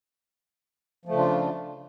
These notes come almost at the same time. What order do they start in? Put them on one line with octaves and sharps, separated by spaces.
F3 A3 C#3 D4 F4